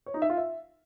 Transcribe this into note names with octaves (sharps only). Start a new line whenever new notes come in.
C#5
D#4
E5
F4
E5